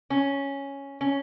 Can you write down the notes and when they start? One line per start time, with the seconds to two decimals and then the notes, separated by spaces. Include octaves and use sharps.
0.10 C#4
1.01 C#4